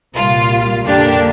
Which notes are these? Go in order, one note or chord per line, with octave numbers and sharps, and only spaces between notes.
C2 A#2 G3 F4
F2 D3 A#3 D4 G4